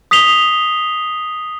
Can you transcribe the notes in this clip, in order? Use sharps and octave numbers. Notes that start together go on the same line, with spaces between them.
D#6 B6 C7 F7 G7